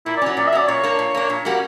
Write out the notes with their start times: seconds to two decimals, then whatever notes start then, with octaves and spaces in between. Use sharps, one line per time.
0.06 A#2 E4
0.17 D5
0.22 F#3 C#4
0.37 A#2 D5
0.47 E5
0.52 F#3 C#4 D5
0.68 A#2 C#5
0.83 A#3 D4
0.99 A#2
1.14 A#3 D4
1.29 A#2
1.45 G3 A#3 C#4 F#4